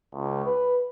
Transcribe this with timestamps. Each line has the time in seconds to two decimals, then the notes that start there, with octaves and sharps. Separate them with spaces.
0.13 C#2
0.45 B4